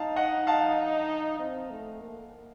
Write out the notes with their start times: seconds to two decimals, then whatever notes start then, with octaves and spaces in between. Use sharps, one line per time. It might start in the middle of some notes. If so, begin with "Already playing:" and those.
Already playing: D#4 F5 A5
0.16 D#5 F#5
0.47 F5 A5
1.39 C4
1.70 A3
2.01 A#3